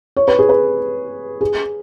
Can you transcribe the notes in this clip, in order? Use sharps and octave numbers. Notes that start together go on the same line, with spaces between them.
C#5
B4
G#4
B4
G#4